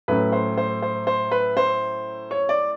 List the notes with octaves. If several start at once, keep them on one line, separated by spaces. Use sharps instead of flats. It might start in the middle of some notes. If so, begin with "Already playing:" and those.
A2 F#3 A3 C#4 B4
C5
C5
C5
C5
B4
C5
C#5
D5